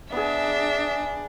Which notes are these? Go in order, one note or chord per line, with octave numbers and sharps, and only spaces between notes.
B3 D4 G#4 E5